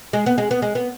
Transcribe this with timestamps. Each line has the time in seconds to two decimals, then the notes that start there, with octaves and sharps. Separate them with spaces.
0.13 G#3
0.26 B3
0.38 G#3
0.51 B3
0.62 G#3
0.75 B3